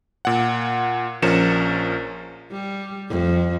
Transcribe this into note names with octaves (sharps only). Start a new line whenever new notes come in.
A#2 F#5
A#1 F3 C#4 A#4 C#7 E7
G3
F2